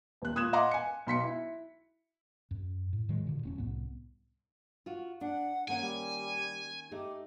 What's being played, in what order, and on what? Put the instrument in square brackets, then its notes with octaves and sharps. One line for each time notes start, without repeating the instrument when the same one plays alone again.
[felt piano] D#1 F#6
A#2 D#6 F#6 G#6 E7
D#5 F5 F#5 A#5 C6 D6
G#5 C#7
B1 C6 B6 C#7
E4
[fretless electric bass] F#2
A2
A2 D#3 F#3 G#3
A#2 D3
F1 C4 C#4
C2 A2 B3
[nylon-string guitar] F4 F#4
[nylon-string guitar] D4 [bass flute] F#5
[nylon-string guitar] D#3 A#3 C#4 [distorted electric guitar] G#5
[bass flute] G3
[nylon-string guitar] A3 D#4 [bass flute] G4